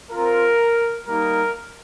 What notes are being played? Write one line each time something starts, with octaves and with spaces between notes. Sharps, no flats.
C4 F4 A#4
G3 A#3 D#4 A#4